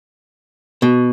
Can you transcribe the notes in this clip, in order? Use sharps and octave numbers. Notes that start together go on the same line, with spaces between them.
B2